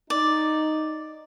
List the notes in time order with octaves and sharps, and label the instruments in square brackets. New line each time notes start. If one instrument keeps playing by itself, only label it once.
[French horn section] D#4 [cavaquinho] D5